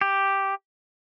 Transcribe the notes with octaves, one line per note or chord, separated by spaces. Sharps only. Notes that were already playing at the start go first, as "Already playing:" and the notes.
G4